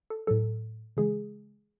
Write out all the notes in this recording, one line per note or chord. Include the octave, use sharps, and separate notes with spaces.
A4
A2 F#3 A4
C#3 E3 G#3 G#4